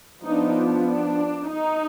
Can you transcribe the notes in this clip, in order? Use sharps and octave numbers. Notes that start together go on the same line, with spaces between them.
F3 B3 D4 D#4
D4
D#4